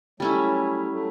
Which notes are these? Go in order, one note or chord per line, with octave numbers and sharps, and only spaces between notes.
F#3 G3 A3 C#4 E4
F#3 A3